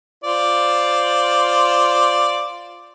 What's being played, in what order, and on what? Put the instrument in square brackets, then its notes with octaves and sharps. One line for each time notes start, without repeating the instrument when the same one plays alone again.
[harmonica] F4 C5 D5